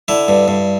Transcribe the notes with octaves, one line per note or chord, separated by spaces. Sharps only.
D3 E4
G2
G2